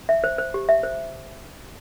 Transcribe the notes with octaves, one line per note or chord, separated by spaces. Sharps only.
E5
C5
C5
G4
E5
C5